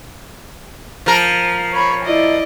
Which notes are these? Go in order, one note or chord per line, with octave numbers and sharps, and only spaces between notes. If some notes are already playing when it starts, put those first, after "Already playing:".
F3 A#4
C#5 B5 C#6
E4 D5 D#5